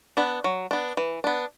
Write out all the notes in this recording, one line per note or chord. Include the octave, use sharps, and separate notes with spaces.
B3 D4
F#3
B3 D4
E3
B3 D4